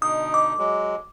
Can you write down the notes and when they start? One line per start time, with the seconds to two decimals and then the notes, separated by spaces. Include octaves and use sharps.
0.02 B2 D3 D#4 D#6
0.34 D6
0.58 F#3 G#3